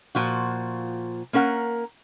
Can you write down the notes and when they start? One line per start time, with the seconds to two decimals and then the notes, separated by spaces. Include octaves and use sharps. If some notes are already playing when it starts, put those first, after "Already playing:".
0.15 A#2 F3 F#4
1.33 A#3 C#4 A#4 F#5